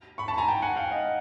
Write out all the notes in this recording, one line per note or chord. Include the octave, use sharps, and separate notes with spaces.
B5 C#6
A5 B5
G#5 A#5
G5 A5
F#5 G#5
F5 G5
D#5 F5